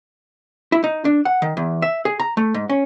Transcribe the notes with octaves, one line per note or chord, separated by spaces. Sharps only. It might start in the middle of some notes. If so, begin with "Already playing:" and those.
E4
D#4
D4
F#5
D#3
E2
E5
G#4
A#5
A3
G#2
C#4